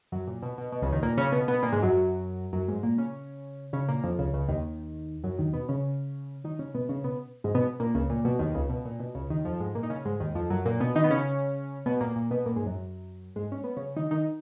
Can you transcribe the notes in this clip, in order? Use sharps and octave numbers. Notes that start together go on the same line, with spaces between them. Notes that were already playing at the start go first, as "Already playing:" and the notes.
F#2 F#3
A#2
B2
B2
B2
C#2 C#3
D#2 D#3
A#2 A#3
C#3 C#4
B2 B3
B2 B3
A#2 A#3
G#2 G#3
F#2 F#3
F#2 F#3
G#2 G#3
A#2 A#3
C#3 C#4
C#3 C#4
A#2 A#3
F2 F3
C#2 C#3
C#2 C#3
D#2 D#3
F#2 F#3
D#2 D#3
B2 B3
C#3 C#4
D#3 D#4
C#3 C#4
B2 B3
C#3 C#4
B2 B3
G#2 G#3
B2 B3
A#2 A#3
C#2 C#3
A#2
B2
D#2 D#3
C#2 C#3
B2
A#2
B2
C#2 C#3
D#2 D#3
F2 F3
G#2 G#3
A#2 A#3
D#4
C#3 C#4
G#2 G#3
D#2 D#3
F2 F3
F#2 F#3
A#2 A#3
B2 B3
D#3 D#4
B3
C#3 C#4
B2 B3
A#2 A#3
A#2 A#3
B2 B3
A#2 A#3
G#2 G#3
F#2 F#3
G#2 G#3
C#4
B3
C#3 C#4
D#3 D#4
D#3 D#4